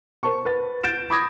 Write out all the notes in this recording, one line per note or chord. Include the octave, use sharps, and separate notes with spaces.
A#4 C5 A5 C#6
B4 A6
G6 A6 D7 E7
B5 D6 D#6 G#6 A#6